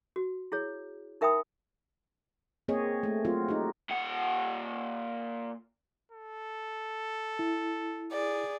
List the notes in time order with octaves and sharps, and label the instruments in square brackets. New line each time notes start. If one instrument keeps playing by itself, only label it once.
[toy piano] F#4
E4 G#4 C#5
D#4 A#4 E5 G5 B5 D#6
[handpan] A#3 C4 G#4 C#5 D#5
A3
F#3 C4 F4 F#4
D#4 G4
[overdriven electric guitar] A#2 F#5
[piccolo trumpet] A4
[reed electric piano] E4
[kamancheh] G#4 D5